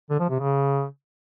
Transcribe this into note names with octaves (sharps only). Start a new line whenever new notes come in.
D3
F3
C3
C#3